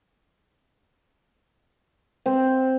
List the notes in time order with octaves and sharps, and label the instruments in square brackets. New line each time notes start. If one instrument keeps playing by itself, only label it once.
[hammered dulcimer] C4